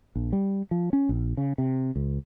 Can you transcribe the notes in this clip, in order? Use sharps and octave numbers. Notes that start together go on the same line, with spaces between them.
A#1
G3
F3
C#4
A#1
C#3
C3
C#2